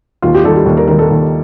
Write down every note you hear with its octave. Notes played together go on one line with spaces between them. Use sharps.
D#2 F4
G4
D#3 G3 A4
G4
D#2
A#4
D#3 G3 A#4
A4
D#2